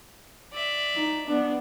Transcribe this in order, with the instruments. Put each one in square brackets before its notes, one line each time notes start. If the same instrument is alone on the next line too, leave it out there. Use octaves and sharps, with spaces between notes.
[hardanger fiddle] D5 E5
[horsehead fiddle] D#4
[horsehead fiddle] B3 [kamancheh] D4